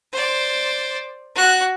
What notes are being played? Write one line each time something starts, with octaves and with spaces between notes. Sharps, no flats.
C5 D5
F#4 F#6